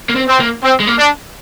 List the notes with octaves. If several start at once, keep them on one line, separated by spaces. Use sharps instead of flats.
A#3
C4
C4
A#3
C4
G#3
A#3
D4